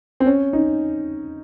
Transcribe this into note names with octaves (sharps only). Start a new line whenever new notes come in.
C4
C#4
D#4